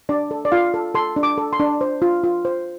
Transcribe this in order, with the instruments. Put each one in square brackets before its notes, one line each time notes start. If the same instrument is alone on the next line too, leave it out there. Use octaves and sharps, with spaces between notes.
[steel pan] D4 D5
A4
D5
F4 F5
A4
A4 C6
D4
D6
A4
C6
D4
C5
F4
F4
C5